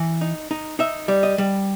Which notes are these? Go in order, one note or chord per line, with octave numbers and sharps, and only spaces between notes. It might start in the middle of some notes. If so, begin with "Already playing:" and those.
Already playing: E3
D#4
D#4
D#4 E5
G3
D#5
G3